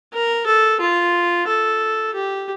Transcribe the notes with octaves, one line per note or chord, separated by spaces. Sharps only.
A#4
A4
F4
A4
G4